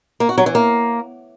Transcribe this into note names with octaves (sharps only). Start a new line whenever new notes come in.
A#3
F#4
F#3
E3
A#3